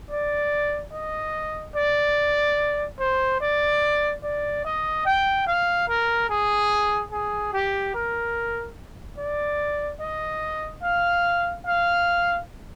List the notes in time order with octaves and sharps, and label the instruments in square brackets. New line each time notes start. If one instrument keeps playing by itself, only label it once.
[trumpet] D5
D#5
D5
C5
D5
D5
D#5
G5
F5
A#4
G#4
G#4
G4
A#4
D5
D#5
F5
F5